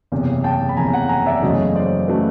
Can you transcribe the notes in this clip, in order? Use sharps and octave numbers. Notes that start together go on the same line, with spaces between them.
F#1 E2 C3
G5 A5
B5
F#1 E2 C3 G#5 A#5
F#5 G#5
G#5 A#5
D5 E5
F#1 E2 C#3 F#3 A3 C#5 D#5
C5 D5
C#3 F#3 A3 B4